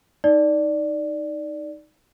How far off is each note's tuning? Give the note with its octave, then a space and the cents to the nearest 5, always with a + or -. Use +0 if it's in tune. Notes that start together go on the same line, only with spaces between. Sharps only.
D#4 +0 D5 +0